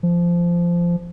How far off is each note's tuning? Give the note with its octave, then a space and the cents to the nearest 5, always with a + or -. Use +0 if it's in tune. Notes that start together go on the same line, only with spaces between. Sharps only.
F3 -15